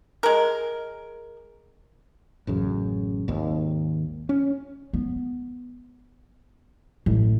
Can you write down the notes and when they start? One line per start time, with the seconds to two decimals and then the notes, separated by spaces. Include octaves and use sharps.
0.23 G#3 A#4
2.47 A1 F#2 C#3
3.28 G#1 D#2
4.29 C#4
4.93 B3
7.06 A1